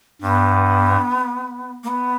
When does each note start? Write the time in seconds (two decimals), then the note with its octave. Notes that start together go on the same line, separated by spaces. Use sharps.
0.22 G2 B3
1.84 A#3
1.88 B3